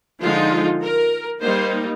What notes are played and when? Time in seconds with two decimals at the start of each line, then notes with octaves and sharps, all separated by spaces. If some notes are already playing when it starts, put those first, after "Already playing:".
0.22 D3 F3 G#3 D#4 F4
0.82 A#4
1.42 G3 A#3 D#4 C5